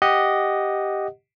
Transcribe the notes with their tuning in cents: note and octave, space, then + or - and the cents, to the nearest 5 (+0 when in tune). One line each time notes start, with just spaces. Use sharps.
G4 +0 D#5 +0 F#5 +0